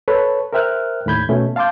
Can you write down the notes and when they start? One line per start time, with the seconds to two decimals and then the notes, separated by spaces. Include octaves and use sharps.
0.08 A4 B4 C#5
0.53 A#4 C5 E5 G5 F6 F#6
1.06 D#2 A2 B5 G6 G#6
1.29 B2 A3 C#4
1.56 F5 A5 C6 D6 G6